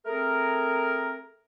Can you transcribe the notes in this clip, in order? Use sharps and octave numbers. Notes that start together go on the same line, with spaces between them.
A3 C4 G#4 A#4